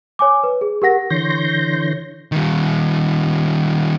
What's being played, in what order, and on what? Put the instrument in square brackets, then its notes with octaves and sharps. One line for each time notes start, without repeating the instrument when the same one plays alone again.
[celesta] C#5 G#5 D6
B4
G#4
G4 A#4 F#5 A#6
[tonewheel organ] D3 E3 C#5 C6 G6 A#6
[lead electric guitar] D#3 G3